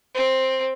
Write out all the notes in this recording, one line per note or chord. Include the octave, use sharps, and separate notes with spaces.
C4